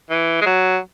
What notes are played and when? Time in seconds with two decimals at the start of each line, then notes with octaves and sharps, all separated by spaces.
0.10 E3
0.41 G#3
0.46 F#3